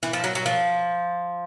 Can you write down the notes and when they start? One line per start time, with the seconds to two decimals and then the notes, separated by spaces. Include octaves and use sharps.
0.03 E3
0.13 F3
0.24 F#3
0.35 F#3
0.46 F3